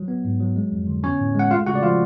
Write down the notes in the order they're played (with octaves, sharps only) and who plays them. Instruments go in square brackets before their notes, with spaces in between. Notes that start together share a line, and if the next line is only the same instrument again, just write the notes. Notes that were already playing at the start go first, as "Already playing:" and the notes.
Already playing: [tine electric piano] F#3
B3
G#2
F#3
G#3
F2
D3
B3 C#4 C#5
A2
G#3 F#5
A3 F4 F5
C#3 F#4 F#5
D5
F3 F4 F5